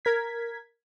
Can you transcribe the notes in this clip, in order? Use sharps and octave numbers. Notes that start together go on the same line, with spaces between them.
A#4 G#6 B6